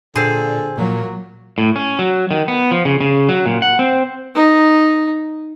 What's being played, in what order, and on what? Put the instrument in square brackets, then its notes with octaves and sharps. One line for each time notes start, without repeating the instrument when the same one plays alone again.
[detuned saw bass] A#2 [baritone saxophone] D3 [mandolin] C4 G#4
[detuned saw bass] A#2 [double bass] F#3 [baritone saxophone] A#3
[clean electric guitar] A2
C#4
F#3
D#3
B3
F3
C#3
C#3
F#3
A#2
F#5
C4
[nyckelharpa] D#4